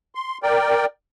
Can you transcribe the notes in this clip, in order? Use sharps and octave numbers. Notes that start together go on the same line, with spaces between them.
C6
A#4 D5 G5